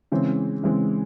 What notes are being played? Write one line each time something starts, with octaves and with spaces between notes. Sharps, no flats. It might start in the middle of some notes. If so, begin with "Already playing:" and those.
C#3 E3 G#3 C4
C#3 E3 G#3 C4